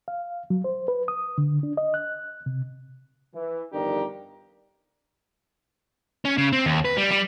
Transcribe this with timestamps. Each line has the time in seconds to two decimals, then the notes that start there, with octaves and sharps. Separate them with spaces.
0.08 F5
0.50 F#3
0.64 C5
0.88 B4
1.08 D#6
1.38 D3
1.63 D4
1.77 D#5
1.94 F#6
2.46 C3
3.34 E3
3.73 G1 F2 D#3 D4 G4 A#5
6.25 C#4
6.38 C#3
6.53 C4
6.66 D#2
6.85 B4
6.98 G3
7.12 G3